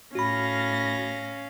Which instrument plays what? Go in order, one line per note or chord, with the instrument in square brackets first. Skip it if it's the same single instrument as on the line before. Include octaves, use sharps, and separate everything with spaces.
[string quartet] A2 A#6 [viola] C#4 F5 [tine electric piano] F#4 B5